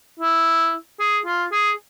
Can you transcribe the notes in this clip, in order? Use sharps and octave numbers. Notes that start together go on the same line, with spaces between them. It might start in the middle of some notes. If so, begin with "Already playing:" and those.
E4
G#4
F4
G#4